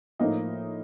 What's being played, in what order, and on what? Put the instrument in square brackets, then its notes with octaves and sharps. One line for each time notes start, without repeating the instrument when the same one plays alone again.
[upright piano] A2 F3 A#3 D#4